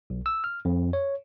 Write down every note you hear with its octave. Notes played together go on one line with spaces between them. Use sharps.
B1
E6
F6
F2
C#5